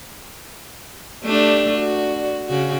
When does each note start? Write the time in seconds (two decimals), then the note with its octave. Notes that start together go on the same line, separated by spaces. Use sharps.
1.25 A3 D4 G4 D5
1.75 F#4
2.48 C#3 F#4